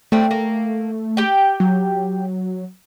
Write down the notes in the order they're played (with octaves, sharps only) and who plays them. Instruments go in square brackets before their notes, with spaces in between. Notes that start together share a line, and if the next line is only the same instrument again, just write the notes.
[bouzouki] G3 C4 D4 [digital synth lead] A3
[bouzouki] A#3
G4 G5
[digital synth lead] F#3